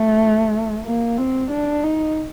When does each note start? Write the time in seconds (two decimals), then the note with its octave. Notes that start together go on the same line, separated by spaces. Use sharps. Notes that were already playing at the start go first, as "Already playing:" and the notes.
Already playing: A3
0.85 A#3
1.18 C4
1.51 D4
1.84 D#4